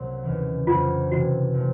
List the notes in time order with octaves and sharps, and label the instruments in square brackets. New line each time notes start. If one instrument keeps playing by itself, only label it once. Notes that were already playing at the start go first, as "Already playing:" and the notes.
Already playing: [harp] C2 A#2 F#3
D#2 C#3 E3
[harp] F2 C#3 F#3 A#3 D4 [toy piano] F4
[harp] C3 E3 G3 [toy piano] F#4
[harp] A#2 F3 A3